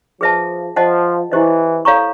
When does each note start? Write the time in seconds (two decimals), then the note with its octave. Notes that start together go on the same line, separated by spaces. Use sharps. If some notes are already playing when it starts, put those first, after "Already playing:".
0.21 F3 G#4 B4 E5 A5
0.76 F3 C5 D#5 F#5 A5
1.31 E3 E4 G4 C5 D#5
1.85 A4 C#5 F5 A#5 C#6